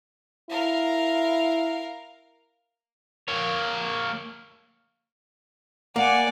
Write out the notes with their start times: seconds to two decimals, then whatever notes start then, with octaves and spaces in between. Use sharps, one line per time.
0.49 E4 A#4 F5
3.28 A#3 C#5
5.96 A#3 D5 F#5 G#5